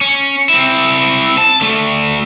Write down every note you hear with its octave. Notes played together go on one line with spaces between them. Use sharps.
C#4
C4 E4
A5
D3 A3